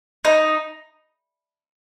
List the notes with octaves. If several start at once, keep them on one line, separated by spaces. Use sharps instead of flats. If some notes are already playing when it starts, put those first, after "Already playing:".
D#4